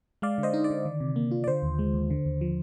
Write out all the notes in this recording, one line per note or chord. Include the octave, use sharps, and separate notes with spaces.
G#3 D5 F5
D3
C5 D#5
D#4
D5
D3
D#3
C3
A#3
F4
D5
D3 C5
D#2
G#3
D#2
D3
D#2
F3